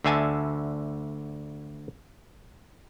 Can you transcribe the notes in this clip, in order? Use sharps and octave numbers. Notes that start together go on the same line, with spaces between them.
D2 D3 E5 G#5 A5